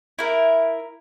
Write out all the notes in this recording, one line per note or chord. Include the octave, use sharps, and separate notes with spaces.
E4 A#4